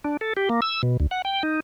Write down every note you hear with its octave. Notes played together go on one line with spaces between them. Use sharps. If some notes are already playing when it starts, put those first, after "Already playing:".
D4
A4
G4
A#3
E6
B2
D2
F#5
G5
D#4